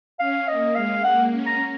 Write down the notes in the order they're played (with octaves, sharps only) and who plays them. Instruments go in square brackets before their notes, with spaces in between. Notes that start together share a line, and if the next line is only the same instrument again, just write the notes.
[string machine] C#4 [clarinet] F5
[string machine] A#3 [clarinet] D#5
[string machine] G#3 [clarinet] F5
[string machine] A#3 [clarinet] F#5
[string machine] C#4
[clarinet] A#5